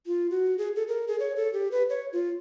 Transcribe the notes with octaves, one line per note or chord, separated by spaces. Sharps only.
F4
F#4
G#4
A4
A#4
G#4
C#5
A4
G4
B4
C#5
F4